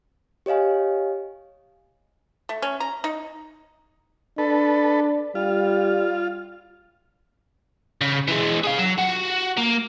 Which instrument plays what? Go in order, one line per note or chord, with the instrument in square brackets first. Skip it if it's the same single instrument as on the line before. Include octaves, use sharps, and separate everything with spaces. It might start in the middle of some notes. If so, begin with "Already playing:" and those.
[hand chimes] G4 C#5 D#5 F5 G#5
[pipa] A3
C#4
A#5
D#4
[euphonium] D4 [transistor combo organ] A4 B4
[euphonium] G3 [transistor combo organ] F4
[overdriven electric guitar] C#3
E3 G#3
G#4 F5
F#3
F#4
A#3